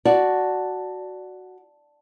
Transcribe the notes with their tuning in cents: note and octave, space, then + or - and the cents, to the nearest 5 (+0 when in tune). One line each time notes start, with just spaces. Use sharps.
F#4 +0 D5 +0 A5 +0